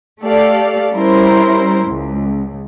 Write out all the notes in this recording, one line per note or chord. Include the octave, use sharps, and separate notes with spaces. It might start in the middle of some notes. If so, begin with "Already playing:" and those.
A3 G4 A4 D5 F5
G3 C#4 E4 A#4 C5
C#2